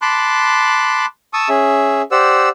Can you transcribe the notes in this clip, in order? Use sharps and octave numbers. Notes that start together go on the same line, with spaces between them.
A5 B5 C6 D6 F#6
A5 C#6 D#6 E6
C#4 G#4 E5
G4 C5 D5 F#5 E6